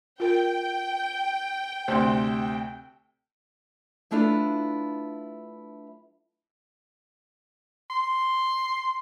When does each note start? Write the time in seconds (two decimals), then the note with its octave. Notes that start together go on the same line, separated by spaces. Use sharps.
0.20 F4 A#4 G5
1.88 D2 C3 C5 C6
4.11 F#3 A3 D4 E4 F4 B4
7.90 C6